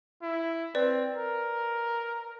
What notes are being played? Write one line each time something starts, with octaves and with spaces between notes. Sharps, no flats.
E4
C4 B4 D5
A#4